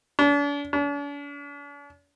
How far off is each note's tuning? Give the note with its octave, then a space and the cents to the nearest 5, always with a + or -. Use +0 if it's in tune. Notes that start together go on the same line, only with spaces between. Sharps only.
D4 -40
D4 -45